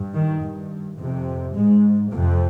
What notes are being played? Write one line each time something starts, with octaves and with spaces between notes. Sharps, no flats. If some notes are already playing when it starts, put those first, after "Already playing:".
Already playing: G2
D#3
G2
F2 C3
G#2 G#3
F2 C3 A#3